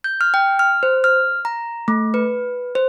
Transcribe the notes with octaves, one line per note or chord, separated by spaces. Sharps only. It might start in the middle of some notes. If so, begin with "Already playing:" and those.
G6
F6
G5
F6
C5
F6
A#5
A3
B4
C5